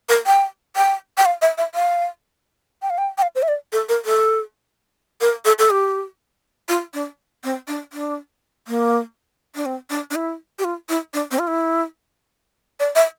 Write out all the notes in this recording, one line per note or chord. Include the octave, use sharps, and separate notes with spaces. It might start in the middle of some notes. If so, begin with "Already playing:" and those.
A#4
G5
G5
G5
F5
E5
E5
F5
G5
F5
G5
G5
F5
C5
E5
D5
A4
A#4
A4
A#4
A4
A4
G4
F4
D4
C4
D4
D4
A#3
D4
C4
D4
D4
E4
G4
F4
E4
D4
C4
F4
E4
D5
E5